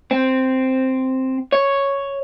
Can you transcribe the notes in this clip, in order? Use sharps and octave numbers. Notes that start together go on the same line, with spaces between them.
C4
C#5